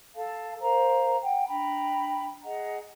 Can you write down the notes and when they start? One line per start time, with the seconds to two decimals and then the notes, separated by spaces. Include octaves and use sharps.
0.15 A4 F5 A5
0.61 A#4 C5 F5 A#5
1.22 F#5 G5
1.48 D4 G5 A#5 B5
2.43 G#4 D#5 F#5 A#5